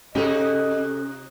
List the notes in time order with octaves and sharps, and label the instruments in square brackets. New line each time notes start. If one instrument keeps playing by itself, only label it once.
[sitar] C3 D#4 F#4 [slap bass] C#4 [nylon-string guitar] G4 A4 C#5 [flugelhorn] D#5